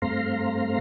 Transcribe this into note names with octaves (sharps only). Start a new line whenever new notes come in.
G2 A3 C4 F5 A#5 C6